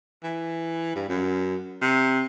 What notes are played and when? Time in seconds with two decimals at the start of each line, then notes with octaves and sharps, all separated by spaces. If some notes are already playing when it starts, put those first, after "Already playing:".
0.23 E3
0.95 G2
1.09 F#2
1.81 C3